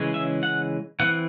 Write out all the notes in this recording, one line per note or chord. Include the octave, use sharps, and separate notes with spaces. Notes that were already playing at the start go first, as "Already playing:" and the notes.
Already playing: C#3 E3 G#3 C#4
E5
F#5
E3 C4 F#5